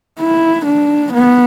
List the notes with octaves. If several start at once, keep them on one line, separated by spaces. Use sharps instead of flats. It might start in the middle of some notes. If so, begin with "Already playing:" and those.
E4
D4
B3